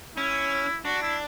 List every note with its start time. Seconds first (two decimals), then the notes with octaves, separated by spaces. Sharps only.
0.16 C#4 E4
0.85 D4 F#4
1.02 E4